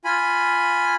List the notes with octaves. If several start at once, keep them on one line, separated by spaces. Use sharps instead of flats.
F4 G#5 B5